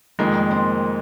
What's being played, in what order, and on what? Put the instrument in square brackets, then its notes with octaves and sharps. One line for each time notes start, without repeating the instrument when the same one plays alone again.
[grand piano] F1 F2 D#3 G#3 [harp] A#3 A#4
[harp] C4 C5